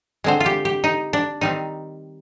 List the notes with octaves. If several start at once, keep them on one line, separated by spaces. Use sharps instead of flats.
D3 G#3 C4 C5
F4
G4
G4
D#4
D4
D#3 G3 C4 D#4